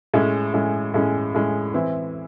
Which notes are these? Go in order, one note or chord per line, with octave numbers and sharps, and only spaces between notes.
A2 G#3 C#4
A2 G#3 C#4
A2 G#3 C#4
A2 G#3 C#4
E3 C4 E4